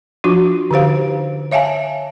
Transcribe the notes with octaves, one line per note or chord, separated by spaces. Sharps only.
F3 D4 F4 F#4
D3 D#4 G4 C5 F5
C#5 E5 F5 G#5 A5